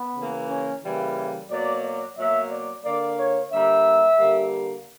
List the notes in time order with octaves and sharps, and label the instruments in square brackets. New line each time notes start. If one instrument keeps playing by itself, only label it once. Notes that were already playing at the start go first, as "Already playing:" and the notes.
Already playing: [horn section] B3
C#3 E3 A#3
C#4
C#3 E3 G3 A#3 E4
B2 F#3 A#3 D5
D5
B2 F#3 A#3 E5
D5
D3 A#3 D5
C#5
D3 G3 A#3 E5
D3 G3 A#3